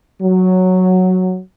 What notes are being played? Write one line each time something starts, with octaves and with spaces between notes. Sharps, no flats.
F#3